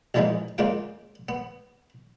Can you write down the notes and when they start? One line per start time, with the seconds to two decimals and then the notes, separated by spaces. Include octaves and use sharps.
0.14 A1 A#2 E3 F3 G#3 D#4
0.58 C#3 G#3 A#3 F4 G5
1.29 B3